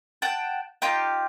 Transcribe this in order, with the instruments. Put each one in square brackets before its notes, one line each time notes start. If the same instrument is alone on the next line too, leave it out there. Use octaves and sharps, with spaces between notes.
[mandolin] F#5 G5 A5
D#4 F4 G4 G5